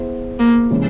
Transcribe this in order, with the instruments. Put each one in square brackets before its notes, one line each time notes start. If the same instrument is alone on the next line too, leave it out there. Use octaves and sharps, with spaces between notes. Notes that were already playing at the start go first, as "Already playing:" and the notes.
Already playing: [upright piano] B3 E4 G#4 C5
[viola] A#3
[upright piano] C3 E3 G#3 C#4